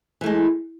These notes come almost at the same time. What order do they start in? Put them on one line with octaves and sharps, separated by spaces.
E3 A3 G#3